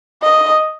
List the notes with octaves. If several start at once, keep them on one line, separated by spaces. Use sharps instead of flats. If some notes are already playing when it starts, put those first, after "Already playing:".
D#5